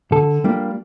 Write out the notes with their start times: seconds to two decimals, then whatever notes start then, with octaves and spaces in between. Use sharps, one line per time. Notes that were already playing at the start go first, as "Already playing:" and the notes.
0.12 D3 A4
0.44 G3 A#3 D4 F4